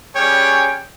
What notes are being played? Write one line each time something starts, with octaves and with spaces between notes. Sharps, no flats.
G3 C#4 G#4 C#5 G5